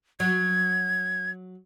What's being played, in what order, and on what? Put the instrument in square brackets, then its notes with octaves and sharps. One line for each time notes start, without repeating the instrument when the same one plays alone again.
[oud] F#3 [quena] G#6